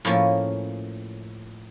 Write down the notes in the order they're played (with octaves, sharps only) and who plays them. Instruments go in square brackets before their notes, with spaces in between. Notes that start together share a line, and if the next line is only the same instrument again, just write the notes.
[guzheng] A2 F3 A#3 C#4